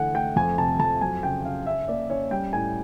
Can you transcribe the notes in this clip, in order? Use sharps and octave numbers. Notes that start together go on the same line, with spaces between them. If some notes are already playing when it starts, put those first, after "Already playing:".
Already playing: D3 E3 A3 F#5 G#5
A3 G5
F2 G#5
C3 A5
F2 A5
F#3 G#5
C#3 G5
C#3 F5
C#4 E5
A#3 D5
C#4 C#5
G3 G5
A2 G#5